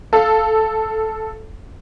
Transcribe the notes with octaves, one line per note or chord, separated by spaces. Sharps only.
A4 F5 A5